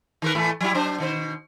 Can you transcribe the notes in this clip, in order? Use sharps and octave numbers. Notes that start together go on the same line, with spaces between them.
D#3 A#4 B4
A2 E3 A3
F#3 G3 E4
F#3 D4 C5
B2 D#3 C5